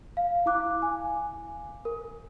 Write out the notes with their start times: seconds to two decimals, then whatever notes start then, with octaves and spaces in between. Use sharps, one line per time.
0.17 F5
0.46 E4 F5 D6 F#6
0.82 G#5
1.85 A#4